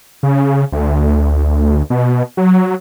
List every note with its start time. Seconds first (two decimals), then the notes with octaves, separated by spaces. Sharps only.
0.23 C#3
0.72 D2
1.90 B2
2.37 F#3